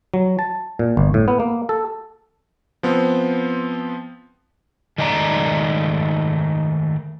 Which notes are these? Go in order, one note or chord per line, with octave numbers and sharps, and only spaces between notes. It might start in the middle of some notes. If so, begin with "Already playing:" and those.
F#3
A5
A#2
G1
A2
B3
A#3
A4
F3 B3 C4
D#3 G#3 A3 D5 D#5 A#5